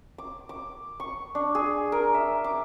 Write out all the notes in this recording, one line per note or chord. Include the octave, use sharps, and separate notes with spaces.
D6
D6
C#6
D4
G#4
A#4
E5
D6